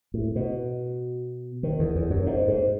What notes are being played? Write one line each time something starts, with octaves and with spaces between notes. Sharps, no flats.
A2
B2
D#3
E2
E2
F#2
G#2
G#2